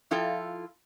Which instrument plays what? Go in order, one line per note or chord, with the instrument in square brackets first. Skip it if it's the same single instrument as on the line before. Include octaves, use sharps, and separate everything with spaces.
[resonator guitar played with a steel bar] F3 E4 F4 A4 G5